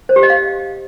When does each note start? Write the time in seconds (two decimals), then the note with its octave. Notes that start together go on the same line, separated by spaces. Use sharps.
0.09 C5
0.16 G4
0.23 D#5
0.30 F5